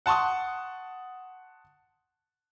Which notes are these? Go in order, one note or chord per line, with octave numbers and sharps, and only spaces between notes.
F#5 A5 C6 C#6 D#6